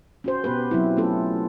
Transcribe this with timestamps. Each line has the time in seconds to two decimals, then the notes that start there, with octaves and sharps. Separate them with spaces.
0.24 C#4 F#4 C5
0.44 B2 B3 G4 B4
0.71 F#3 C4 E4
0.97 A3 B3 C#4 F4 A4